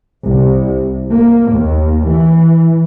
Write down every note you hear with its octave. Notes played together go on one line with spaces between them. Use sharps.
C2
A#3
D#2
E3